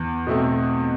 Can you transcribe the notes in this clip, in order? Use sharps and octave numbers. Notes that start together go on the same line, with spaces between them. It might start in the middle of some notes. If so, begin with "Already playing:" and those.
Already playing: E2
B2 A3 C4